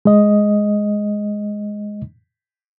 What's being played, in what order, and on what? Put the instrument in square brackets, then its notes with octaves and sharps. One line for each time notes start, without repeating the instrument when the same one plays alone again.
[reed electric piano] G#3 D#5